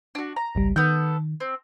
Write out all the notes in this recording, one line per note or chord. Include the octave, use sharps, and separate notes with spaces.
D4 F#4
A#5
G#1 C#2 G3
D#3 B3 A4 G6
C4